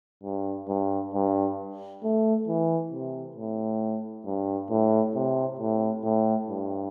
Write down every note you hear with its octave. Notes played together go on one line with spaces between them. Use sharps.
G2
G2
G2
A3
E3
C3
A2
G2
A2
C3
A2
A2
G2